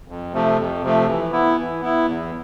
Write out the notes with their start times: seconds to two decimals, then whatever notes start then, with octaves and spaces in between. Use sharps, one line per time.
0.08 F2
0.33 C3 F3 A3
0.58 F2
0.83 C3 F3 A3
1.07 E3
1.32 B3 E4
1.57 E3
1.81 B3 E4
2.06 E2